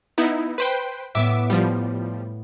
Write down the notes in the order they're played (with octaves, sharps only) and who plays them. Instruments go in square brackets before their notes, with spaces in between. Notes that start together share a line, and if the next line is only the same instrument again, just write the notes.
[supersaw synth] B3 D#4 E4
B4 C5 G5
[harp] A2 B3 [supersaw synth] E5 D6
[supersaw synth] F3 G3